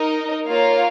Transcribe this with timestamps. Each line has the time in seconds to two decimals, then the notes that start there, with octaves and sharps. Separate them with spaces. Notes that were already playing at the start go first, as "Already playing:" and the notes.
Already playing: D#4 A#4 D#5
0.46 A#3 F4 A#4 C#5 F5